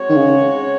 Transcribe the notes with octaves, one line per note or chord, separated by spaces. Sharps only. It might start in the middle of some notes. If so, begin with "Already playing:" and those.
Already playing: G#3 C4 F#4 C#5
D#3
C#3